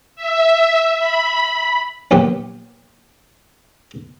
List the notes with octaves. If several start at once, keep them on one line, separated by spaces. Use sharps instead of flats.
E5
B5
A#1 D#2 B3 G4